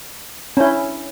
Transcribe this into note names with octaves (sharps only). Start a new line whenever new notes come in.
C#4 D4 E4 C#5